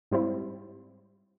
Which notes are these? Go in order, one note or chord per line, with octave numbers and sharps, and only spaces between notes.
G#2 G3 C4 E4